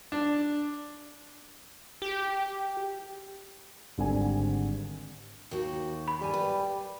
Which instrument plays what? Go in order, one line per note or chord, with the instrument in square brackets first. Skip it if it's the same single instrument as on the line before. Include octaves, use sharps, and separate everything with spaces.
[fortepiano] D4
[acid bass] G4
[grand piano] G#1 D3 G3 C4 G#5
[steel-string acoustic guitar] D#2 D#4 F#4
[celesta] B5
[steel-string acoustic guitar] G2 G#5 [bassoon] G3
[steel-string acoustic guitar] B4